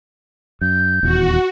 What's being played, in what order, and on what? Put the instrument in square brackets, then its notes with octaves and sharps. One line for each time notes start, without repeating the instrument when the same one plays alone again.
[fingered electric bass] F#2 [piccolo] G6
[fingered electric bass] D#1 E2 [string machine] F#4